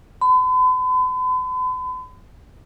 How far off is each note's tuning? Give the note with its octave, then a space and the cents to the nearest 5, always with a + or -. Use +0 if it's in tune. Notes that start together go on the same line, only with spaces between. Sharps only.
B5 +45